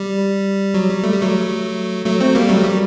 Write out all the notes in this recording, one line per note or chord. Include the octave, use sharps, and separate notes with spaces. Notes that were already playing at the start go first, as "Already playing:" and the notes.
Already playing: G3
F#3
G3
A3
G3
F#3 A3
F#3 A3
A3 C4
G3 A#3
F#3 A3
G3